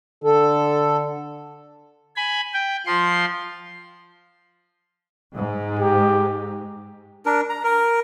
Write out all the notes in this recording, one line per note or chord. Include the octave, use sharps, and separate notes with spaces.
D3 A4
G#5 B5
G5
F3 C6
G#2
G4
D4 A#4
A#5
A#4